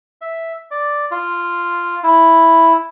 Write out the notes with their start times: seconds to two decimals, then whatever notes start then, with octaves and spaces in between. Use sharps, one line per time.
0.21 E5
0.71 D5
1.11 F4
2.04 E4